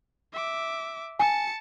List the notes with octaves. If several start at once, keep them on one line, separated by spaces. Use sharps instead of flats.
E5 D6
G#5 A5 C#7